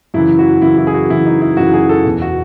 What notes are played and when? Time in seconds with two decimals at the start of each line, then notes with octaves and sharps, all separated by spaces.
0.14 F#2 C#3 E3 E4
0.39 F#4
0.62 F#2 C#3 E3 E4
0.78 E4
0.87 G#4
0.94 F#4
1.10 F#2 C#3 E3 E4
1.26 D#4
1.41 E4
1.57 F#2 C#3 E3 F#4
1.73 G#4
1.89 A4
2.05 E2 B2
2.22 F#4